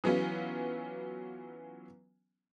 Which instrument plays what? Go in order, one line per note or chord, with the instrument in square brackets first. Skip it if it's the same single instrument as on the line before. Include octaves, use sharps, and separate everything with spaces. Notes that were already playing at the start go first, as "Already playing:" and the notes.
[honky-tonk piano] E3 F#3 B3 C#4 F4